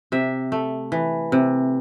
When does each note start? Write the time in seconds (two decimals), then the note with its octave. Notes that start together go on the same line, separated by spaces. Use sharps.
0.12 C3 E5
0.52 A3
0.92 E3
1.32 C3